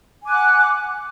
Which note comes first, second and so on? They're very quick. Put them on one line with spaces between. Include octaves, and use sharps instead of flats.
G#5 D6 F#6 F#5